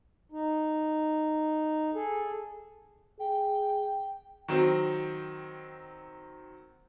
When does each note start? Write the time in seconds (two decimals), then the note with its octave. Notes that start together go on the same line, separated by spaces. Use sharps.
0.32 D#4
1.94 G#4 A4
3.20 G#4 G5
4.48 D#3 F#3 C4